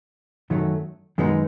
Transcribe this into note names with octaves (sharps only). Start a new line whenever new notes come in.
F#2 D#3 F#3 A3
F#2 D#3 G#3 B3 D#4